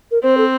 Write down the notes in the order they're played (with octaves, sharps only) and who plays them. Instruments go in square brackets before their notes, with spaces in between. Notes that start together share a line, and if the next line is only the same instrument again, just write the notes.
[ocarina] A#4
[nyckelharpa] C4 [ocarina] C5
[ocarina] A4